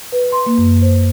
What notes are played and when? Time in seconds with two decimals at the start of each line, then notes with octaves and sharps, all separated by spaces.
0.12 B4
0.32 C6
0.46 A#3
0.58 F#2
0.82 C5